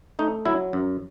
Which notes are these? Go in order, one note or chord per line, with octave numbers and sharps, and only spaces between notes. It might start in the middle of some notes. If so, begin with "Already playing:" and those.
A3 D#4
F#3 E4
F#2